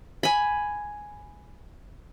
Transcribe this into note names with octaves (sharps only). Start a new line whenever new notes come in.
G#5 B5